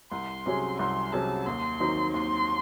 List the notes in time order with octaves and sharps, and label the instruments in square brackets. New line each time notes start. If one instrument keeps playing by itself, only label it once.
[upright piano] C2 [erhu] C6
[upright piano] C3 F#3 C#4 G#4
[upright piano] C2 [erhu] C6
[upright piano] C3 F#3 C#4 G#4 [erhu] A5
[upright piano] D#2 [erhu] C6
[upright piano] D#3 F#3 C4 D#4
[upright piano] D#2 [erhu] C6